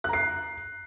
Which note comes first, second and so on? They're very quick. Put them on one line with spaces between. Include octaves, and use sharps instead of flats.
F#6 A#5 C7